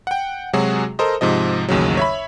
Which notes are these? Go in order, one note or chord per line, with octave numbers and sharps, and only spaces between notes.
F#5 G5
C3 F#3 G#3 F#4 G#4
A4 A#4 C5 D#5
G#2 C3 F3 D#5
A1 D#2 C#3 F#3
C#5 E5 B5